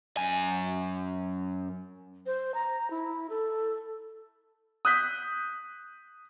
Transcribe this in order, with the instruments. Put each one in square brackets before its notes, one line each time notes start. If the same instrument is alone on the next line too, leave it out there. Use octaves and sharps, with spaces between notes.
[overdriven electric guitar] F#2 G#5
[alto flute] C5
A#5
E4
A4
[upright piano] D#6 F#6 G6 B6